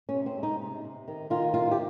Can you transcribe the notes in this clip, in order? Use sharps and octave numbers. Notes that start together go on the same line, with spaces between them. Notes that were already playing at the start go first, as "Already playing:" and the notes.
C#4
C3
C4
G#3
D#4
C3
C3
D#3
D#3 F4
C3 F4
G4